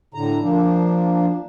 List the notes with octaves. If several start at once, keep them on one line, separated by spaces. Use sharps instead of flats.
A2 D3 A#5
F3 A#3 D4